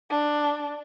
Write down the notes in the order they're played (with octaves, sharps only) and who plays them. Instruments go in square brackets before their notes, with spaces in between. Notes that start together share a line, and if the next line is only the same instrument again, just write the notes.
[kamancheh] D4